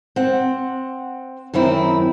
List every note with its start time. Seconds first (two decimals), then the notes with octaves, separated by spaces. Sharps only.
0.16 C4 F#5
1.54 F#2 D#3 C4 E4